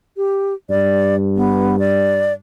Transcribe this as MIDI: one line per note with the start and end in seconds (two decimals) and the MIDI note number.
0.17 0.54 67
0.70 2.40 43
0.70 1.16 74
1.36 1.76 59
1.79 2.33 74